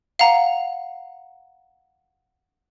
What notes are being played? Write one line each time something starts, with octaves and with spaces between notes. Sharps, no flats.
F5 F#5 A#5